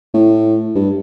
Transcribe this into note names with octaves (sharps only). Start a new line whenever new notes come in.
A2
G2